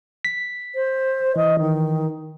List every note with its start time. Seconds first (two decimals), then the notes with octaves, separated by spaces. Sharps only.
0.25 B6
0.75 C5
1.36 E3 D#5
1.59 D#3